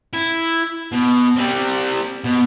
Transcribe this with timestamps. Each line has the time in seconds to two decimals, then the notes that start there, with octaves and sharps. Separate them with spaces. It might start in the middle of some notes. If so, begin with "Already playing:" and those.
0.13 E4
0.92 B2
1.36 G3 C4
2.24 B2